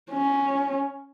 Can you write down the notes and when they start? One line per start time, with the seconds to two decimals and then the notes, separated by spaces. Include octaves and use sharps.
0.11 C#4